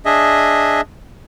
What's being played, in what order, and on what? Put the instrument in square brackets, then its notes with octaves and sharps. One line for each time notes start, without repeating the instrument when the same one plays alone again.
[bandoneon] D4 G#4 D#5 E5